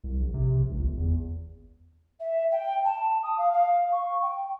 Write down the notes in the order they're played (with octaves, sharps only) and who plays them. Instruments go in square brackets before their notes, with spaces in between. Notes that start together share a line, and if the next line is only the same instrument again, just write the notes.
[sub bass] C2
A#1
C3
A#1
C#2
G1
E2
[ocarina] E5
G5
A5
D#6
F5
F5
C#6
G5